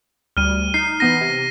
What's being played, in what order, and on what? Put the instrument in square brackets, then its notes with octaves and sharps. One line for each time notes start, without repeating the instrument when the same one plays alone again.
[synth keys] D2 G3 [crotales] F6 D#7
[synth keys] D#4 [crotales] C7
[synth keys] E3 B3 D#4 [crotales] A#6 D#7
[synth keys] C3